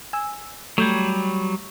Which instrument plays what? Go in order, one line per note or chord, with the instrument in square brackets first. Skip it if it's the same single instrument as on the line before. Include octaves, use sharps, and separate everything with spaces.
[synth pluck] G#5 E6
[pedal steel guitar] F#3 G3 [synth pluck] A3 G6 G#6